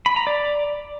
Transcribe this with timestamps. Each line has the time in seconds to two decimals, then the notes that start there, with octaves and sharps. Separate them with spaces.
0.06 B5
0.16 A#5
0.27 D5